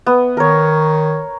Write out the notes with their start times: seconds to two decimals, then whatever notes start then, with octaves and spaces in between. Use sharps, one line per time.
0.06 B3
0.37 D#3 A#4 C#5